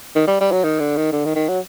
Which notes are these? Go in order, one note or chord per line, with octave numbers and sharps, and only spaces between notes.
D#3
G3
G3
F#3
D#3
D3
D#3
D3
D#3
D#3
F#3